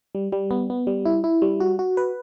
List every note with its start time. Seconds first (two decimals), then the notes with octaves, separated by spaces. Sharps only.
0.15 G3
0.32 G3
0.51 B3
0.70 B3
0.87 G3
1.05 E4
1.24 E4
1.42 G3
1.60 F#4
1.79 F#4
1.97 B4